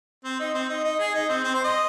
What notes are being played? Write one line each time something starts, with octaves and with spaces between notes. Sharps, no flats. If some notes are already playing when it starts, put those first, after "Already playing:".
C4
D#4
C4
D#4
D#4
G#4
D#4
C4
C4
C5
D#5